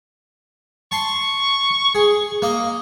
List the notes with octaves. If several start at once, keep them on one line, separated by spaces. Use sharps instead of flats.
A5 C6 C#6
G#4
A#3 D#5